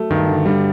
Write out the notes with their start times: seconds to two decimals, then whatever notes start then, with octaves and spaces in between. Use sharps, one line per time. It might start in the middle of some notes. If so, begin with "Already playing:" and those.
Already playing: F#3 A3
0.11 G2 D#3
0.29 D3
0.46 D3 G3